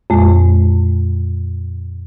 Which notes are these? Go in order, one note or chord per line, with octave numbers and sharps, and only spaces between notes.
F2 A#2 G#3